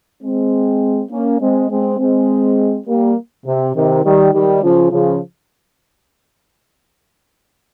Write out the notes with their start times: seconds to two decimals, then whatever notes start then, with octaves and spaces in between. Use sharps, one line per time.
0.23 G#3 C4
1.10 A#3 C#4
1.40 G#3 C4
1.69 G#3 C4
1.98 G#3 C4
2.86 G3 A#3
3.45 C3
3.74 C3 D#3
4.04 D#3 G3
4.33 D#3 G3
4.62 C#3 F3
4.91 C#3 F3